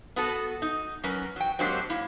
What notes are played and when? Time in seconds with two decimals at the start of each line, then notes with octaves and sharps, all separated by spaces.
0.16 B3 F#4 A4
0.62 D#4
1.03 F#3 C#4 A#4 B4
1.36 F#3 G5
1.59 F#3 G#3 A#3 C4 D4 G4
1.90 A#3 E4